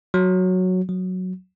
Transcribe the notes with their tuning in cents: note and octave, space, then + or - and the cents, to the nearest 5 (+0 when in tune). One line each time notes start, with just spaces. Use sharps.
F#3 -5
F#3 -5